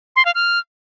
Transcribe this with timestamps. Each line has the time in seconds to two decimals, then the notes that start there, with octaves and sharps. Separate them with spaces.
0.16 C6
0.25 F5
0.35 F6